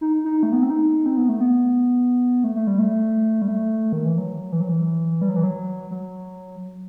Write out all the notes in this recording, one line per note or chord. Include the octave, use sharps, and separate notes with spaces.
D#4
D#4
A3
B3
C4
D#4
C4
B3
A3
B3
A3
A3
G3
A3
G3
A3
D#3
E3
F#3
E3
F#3
E3
G3
F#3
E3
F#3
F#3